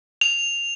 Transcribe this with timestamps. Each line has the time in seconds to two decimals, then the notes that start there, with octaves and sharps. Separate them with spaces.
0.21 F7